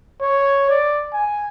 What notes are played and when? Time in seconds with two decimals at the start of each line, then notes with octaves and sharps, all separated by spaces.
0.21 C#5
0.70 D5
1.13 G#5